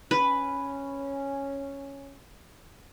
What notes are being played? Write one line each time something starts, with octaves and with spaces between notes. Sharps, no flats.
C#4 B4